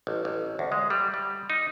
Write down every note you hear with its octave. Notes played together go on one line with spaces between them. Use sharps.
A1
A1
D2
G#3
G3
G3
D#4